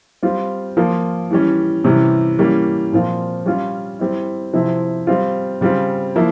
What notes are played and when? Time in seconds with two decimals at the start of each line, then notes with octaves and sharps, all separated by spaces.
0.23 G3 C4 F4
0.77 F3 A#3 F4
1.30 E3 G3 C#4
1.84 C3 E3 G3 C#4
2.39 E3 G3 A#3 C#4
2.92 A#2 F3 C4 F4
3.46 G3 C#4 F4
3.99 G3 C4 E4
4.53 C3 F3 C4 E4
5.07 G3 C4 F4
5.61 C#3 G3 C4 F4
6.16 F3 A#3 E4